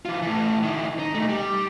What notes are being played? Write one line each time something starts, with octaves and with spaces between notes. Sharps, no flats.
E3 F4
A2 E3
D#3 E4
D#4
A#2 A3
G3